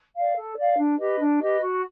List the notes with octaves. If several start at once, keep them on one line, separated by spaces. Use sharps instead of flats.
D5 F5
A4
D5 F5
D4
G4 B4 D#5
D4
G4 B4 D#5
F#4